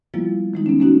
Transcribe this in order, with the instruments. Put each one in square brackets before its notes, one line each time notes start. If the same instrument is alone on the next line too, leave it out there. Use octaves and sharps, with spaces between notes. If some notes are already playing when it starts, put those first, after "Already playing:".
[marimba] F3 G3 A#3 B3 E4 F4
D#3 G#3 D#4
B3 C#4
A#3 B3 C#4 D#4 F#4